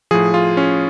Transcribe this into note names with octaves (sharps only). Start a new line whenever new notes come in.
A2 F3 G#4
F4
C#4